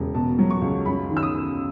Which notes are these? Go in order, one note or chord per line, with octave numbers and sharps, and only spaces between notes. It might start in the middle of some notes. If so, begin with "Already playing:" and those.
Already playing: E1 C#3
B2 A5
F#3
C#6
C#2
F#2 B5
D#3
E6
D#6